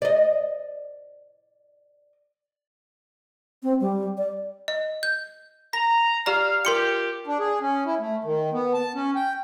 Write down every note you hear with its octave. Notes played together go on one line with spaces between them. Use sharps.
D5 D#5
C4
G3
D5
D#5
G6
A#5 A#6
G4 D5 F5 A#5
F4 G4 A#4 C6 C#7
D4
G#4
C#4
E4
A3
D#3
B3
A5
C#4
G5